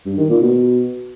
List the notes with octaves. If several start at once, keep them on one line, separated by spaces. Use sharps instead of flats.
G2
D#3
A#2
B2